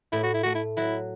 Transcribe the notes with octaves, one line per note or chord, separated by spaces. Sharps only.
A2 E4
F#4
E4
A3 F#4
E4
F#3 E4